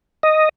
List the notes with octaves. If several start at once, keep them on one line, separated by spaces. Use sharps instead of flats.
D#5